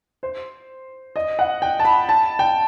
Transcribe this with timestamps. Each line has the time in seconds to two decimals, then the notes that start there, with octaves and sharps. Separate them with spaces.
0.23 C5
1.16 D#5
1.39 F#5
1.62 G5
1.79 A5
1.85 B5
2.09 A5
2.39 G5